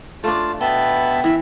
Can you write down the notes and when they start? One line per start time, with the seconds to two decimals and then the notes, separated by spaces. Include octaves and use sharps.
0.24 A3 D4 F4 A5
0.61 B2 B3 E5 G5 A5
1.24 E3 E5